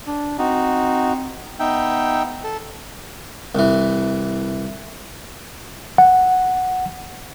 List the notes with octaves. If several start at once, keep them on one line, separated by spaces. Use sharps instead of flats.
D4
C4 D#4 F#4
B3 D#4 E5 G5
A4
C2 E3
F#5